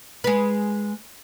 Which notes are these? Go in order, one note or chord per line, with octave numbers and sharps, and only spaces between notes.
G#3 B4